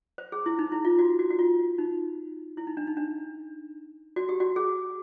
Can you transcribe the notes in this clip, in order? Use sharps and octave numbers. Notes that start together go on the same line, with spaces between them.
C5
G#4
E4
D#4
E4
F4
F#4
F#4
F#4
F4
D#4
E4
D#4
D4
D#4
D4
F#4
G4
F#4
G#4